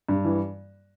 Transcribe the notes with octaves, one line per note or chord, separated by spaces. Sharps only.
G2
E3